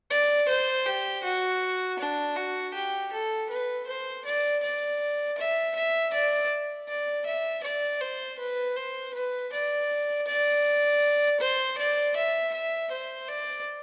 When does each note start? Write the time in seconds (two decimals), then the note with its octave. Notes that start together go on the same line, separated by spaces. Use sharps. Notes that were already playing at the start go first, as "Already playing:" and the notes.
0.11 D5
0.49 C5
0.86 G4
1.24 F#4
1.99 D4
2.36 F#4
2.74 G4
3.12 A4
3.50 B4
3.87 C5
4.25 D5
4.63 D5
5.38 E5
5.76 E5
6.13 D5
6.89 D5
7.26 E5
7.64 D5
8.01 C5
8.39 B4
8.77 C5
9.15 B4
9.53 D5
10.27 D5
11.40 C5
11.78 D5
12.16 E5
12.54 E5
12.92 C5
13.29 D5